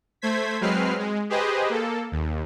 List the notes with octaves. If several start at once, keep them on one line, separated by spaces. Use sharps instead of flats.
A3 C5 G#6 B6
F#3 G#3 C4 B4 F6 C7
G#3
G4 G#4 B4 C5 D#5
A#3 A4
D#2